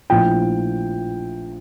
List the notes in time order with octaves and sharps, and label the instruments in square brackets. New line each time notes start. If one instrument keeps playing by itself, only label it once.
[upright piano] A#1 A2 F3 G5